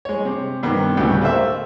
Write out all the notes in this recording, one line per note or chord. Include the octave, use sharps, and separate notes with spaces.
G#3 C#5
C3
G2 C3 D#3 B3
D2 A2 C#3 B3 G4
A3 A#3 C5 E5